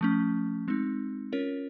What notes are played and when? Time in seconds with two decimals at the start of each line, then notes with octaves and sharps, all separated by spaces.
0.01 F3 A3 C#4
0.68 G#3 C4 D#4
1.32 C#4 F4 A#4 C#5